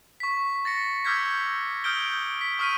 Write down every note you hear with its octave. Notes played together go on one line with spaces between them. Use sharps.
C#6 B6
A6 A#6 C#7
D6 E6 F6 G6 G#6 B6
D#6 F6 G6 D7 G7
B6
C#6 D#6 F6 B6 D7 D#7